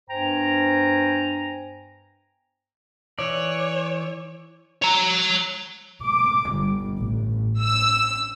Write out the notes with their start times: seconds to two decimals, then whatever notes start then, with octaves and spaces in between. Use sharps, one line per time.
0.09 G2 B3 C5 G5 G#5 A#5
3.19 E3 C#5 D5
4.82 C#5 A#5
6.05 D6
6.54 G1
7.01 A1
7.60 E6